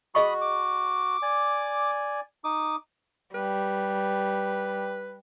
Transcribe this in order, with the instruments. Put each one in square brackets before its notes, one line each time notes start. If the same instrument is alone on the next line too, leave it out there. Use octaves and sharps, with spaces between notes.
[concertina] F#4 [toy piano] G#4 D#5 C#6 [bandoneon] B5 D#6
[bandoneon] D6
[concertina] D5 G#5
D#4 D6 D#6
[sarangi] G3 [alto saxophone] B4